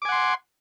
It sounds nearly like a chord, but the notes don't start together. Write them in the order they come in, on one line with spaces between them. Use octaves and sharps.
D6 G#5 F#5 C6